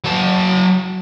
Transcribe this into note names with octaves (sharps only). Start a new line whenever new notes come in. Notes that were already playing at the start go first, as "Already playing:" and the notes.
F#3 A5